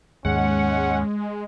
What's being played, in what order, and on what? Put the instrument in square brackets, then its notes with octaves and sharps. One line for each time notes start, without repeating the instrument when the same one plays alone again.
[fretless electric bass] D#2 G#2 [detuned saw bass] G#3 [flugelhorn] C#4 [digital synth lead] F#5